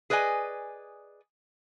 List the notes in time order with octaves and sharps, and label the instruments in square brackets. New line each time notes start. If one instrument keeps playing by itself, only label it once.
[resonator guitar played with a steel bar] G#4 B4 D5 D#5 G#5